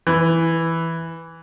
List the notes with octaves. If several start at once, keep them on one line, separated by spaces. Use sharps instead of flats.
E3